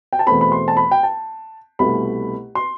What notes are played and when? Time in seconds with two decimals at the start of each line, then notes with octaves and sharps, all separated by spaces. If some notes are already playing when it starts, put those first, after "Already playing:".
0.13 G5
0.19 A5
0.27 E2 B2 A3 C4 B5
0.41 B5
0.52 C6
0.68 A5
0.77 B5
0.91 G5
1.03 A5
1.79 C2 B2 A3 B5
2.55 C6